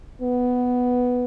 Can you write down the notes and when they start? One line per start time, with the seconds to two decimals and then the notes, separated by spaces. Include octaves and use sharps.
0.21 B3